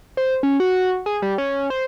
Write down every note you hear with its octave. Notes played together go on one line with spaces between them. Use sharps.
C5
C#4
F#4
G#4
G3
C#4
C5